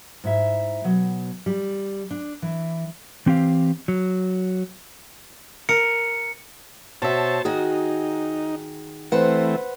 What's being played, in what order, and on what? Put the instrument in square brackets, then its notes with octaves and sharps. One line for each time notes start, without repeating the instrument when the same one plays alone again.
[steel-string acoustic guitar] G#2 E4 E5
B2 F#3
G3
D4
E3
[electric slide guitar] E3 C4 G4 F5
F#3
[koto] A#4 [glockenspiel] C#7
[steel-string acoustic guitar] B2 E5 [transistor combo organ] C5 C#5 A5
[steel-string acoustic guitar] D#3 F#4 G#4 [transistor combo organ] D#4
[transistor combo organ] E3 A3 C4 [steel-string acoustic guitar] B4 C5 F#5